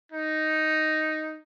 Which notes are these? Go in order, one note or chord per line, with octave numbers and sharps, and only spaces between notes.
D#4